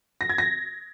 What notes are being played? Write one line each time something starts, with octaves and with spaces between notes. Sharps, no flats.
A#6
G#6
A#6